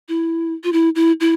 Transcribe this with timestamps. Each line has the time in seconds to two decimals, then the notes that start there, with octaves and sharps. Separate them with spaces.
0.09 E4
0.64 F4
0.73 E4
0.95 E4
1.20 E4